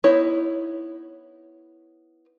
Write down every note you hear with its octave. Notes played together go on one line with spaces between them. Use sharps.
B3 D#4 E4 C#5